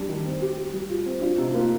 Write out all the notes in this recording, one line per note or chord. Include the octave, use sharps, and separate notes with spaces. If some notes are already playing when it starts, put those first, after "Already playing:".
Already playing: G3 D4
D#3
C4
G4
G4
G3
F4
C4
D4 F4
C3 D#4
D#4
A#3 F4